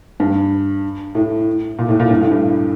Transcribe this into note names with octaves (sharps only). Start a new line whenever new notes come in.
G2
A2
A#2
A2
A#2
G2
A2
G2